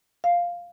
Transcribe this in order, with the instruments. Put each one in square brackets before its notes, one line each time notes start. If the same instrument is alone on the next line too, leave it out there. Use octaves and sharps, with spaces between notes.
[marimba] F5